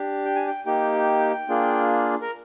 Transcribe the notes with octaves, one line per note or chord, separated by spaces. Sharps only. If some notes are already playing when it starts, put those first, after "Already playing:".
Already playing: D4 G4
G5
G#5
G5
A#3 D#4 G4 G5
A#3 D4 F4 G#4
A#4